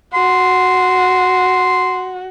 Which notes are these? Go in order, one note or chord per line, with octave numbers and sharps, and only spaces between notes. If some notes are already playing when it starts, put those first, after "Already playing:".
F#4 C6